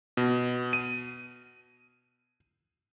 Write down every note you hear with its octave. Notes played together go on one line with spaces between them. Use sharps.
B2
D#7